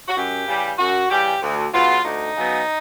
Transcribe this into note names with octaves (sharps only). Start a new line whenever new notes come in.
F#4
F#2 G4
C#3 E3 G3
F#2 F#4
C#3 E3 G3 G4
D2
C#3 F#3 B3 F4
D2 D#4
C#3 F#3 B3